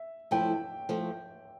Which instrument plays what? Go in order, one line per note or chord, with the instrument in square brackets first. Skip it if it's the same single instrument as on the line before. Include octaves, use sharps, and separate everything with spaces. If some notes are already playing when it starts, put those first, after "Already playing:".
Already playing: [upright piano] E5
[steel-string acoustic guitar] F3 A3 E4 [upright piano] G5
[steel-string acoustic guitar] F3 A3